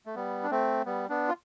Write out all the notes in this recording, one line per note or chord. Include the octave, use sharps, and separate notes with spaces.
A3
G3 B3
D4
A3 C4
G3 B3
B3 D4
F4